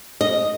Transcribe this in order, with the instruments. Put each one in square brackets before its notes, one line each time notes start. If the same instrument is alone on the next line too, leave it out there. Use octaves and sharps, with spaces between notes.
[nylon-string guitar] D#5